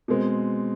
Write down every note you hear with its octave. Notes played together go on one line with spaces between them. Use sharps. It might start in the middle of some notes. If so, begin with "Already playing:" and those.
B2 G#3 C4